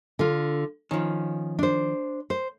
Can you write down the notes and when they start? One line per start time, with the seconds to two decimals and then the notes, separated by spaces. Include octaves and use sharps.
0.19 D3 F4
0.91 D#3 F3 C#4
1.59 D4 C5
2.30 C5